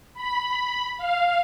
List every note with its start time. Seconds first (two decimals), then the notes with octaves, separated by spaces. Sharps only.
0.14 B5
0.97 F5